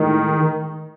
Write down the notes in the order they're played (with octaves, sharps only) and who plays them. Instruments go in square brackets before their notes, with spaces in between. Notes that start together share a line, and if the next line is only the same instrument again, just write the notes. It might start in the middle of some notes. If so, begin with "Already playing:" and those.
Already playing: [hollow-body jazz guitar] A2 G#3 D#4 [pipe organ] D#3